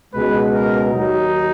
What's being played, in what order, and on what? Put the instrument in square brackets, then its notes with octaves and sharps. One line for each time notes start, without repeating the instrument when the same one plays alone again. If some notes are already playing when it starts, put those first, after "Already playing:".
[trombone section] C#2 B2 G#3 [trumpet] B4
[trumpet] A#4
[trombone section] D#2 D#3 F#3 [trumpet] D#4